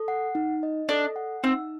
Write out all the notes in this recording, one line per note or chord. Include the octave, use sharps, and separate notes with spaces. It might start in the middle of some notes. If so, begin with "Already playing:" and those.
Already playing: A4
F#5
D#4
D#5
D4 A4
F#5
C4 D#4